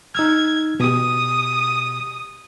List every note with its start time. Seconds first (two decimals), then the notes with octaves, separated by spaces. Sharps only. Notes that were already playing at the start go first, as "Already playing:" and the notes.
0.15 D#4 E6 F6 G#6
0.80 B2 G4 D#6